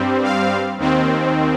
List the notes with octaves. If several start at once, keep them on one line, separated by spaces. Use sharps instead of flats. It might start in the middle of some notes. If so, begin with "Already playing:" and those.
Already playing: G2 G3 C4
F5
D#2 D#3 C4